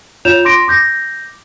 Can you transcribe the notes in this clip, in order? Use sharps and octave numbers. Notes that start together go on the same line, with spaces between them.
F4 C#5 G6 E7 F7
C6 D6 A#6 D7
D6 G6 A#6